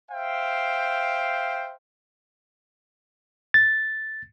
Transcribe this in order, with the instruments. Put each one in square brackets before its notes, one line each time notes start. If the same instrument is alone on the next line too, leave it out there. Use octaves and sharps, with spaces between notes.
[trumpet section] C5 E5 F5 G5
[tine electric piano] A6